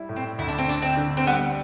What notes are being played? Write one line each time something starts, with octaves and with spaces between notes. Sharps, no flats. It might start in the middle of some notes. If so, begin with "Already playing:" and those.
Already playing: G3 E4
A2
C4
D2 E4
D4
C4
D3 D4
C4
D3
C4
G3 B3